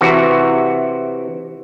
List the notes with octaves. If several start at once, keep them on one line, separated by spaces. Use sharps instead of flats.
C3 E3 F#4